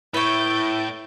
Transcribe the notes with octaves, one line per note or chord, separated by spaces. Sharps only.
A2 E4 B4 C#5 G6 A6 D7